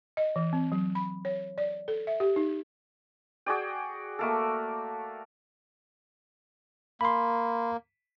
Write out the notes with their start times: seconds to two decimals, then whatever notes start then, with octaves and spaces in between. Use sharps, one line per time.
0.17 D#5
0.36 E3
0.53 C4
0.72 F#3
0.95 B5
1.25 C#5
1.58 D5
1.88 A4
2.07 E5
2.20 G4
2.36 D#4
3.46 F#4 G#4 D5 G5
4.19 A3 A#3 A4
7.01 A#3 B5 C6